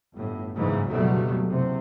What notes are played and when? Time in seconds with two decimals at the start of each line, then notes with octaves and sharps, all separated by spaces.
0.15 G1 A2
0.55 F#1 G#2 C#3 E3
0.89 F#1 D2 B2 F#3 G3 A3
1.46 F#1 C3